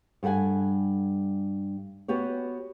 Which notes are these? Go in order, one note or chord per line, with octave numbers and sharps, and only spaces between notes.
G2 G3 A4 F#5 G#5
B3 F#4 G4 C#5